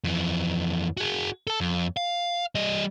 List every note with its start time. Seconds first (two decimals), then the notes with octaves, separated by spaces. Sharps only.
0.04 F2 E3
0.97 F#4 G#4
1.47 A4 A5
1.61 F2
1.97 F5
2.55 G3 D#5